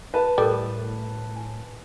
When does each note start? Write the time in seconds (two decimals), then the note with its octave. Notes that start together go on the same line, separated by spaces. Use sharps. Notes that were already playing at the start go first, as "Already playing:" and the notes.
0.14 B4 A5
0.38 A2 G3 A4 A#4
1.36 G#5